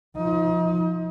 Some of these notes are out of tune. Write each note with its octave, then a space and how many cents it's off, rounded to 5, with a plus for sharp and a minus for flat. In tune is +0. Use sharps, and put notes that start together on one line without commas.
F3 +0 D#4 +35